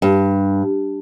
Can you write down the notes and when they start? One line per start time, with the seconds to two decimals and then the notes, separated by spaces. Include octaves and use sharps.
0.02 G2